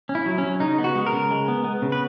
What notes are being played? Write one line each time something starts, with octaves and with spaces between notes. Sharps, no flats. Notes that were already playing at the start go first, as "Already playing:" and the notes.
C#4
E4
F#3
C#4
F#3
C#3 D#4
B3
F#4
G#3
A#4
C#3
G#3
B3
B3
C#3
B4